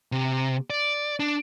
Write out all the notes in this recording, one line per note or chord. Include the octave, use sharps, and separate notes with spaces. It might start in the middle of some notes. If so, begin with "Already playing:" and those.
C3
D5
D4